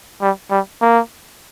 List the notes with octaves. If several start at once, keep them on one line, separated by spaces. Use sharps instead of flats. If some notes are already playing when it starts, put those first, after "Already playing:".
G3
G3
A#3